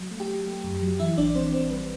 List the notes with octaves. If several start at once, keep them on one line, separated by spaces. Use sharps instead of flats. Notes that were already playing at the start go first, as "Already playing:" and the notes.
Already playing: F#3
A3
G4 G5
F#3
A3
F#2
F#3
E3 E4 E5
A1 D4 D5
E3 C4 C5
A1 C4 C5
G3 B4